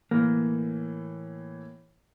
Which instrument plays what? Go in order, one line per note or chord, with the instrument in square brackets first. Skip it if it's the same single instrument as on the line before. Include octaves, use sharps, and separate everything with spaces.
[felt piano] A2 E3 [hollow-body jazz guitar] A#3